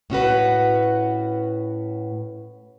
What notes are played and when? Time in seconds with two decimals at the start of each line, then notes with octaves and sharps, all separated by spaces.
0.10 A2 C#4 F#4 B4